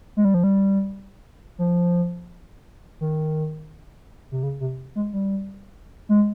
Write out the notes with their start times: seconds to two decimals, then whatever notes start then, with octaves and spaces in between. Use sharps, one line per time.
0.17 G#3
0.25 G3
0.34 F3
0.44 G3
1.59 F3
3.01 D#3
4.32 C3
4.43 C#3
4.60 C3
4.96 G#3
5.14 G3
6.09 G#3